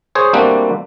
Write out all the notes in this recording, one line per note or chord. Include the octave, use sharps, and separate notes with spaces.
G#4 C5 C#5
G3 A3 A#3 C4 D4 F#4